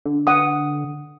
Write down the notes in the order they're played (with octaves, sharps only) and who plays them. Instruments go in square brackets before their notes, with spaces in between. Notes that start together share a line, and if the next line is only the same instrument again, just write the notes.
[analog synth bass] D3
[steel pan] F#5 D#6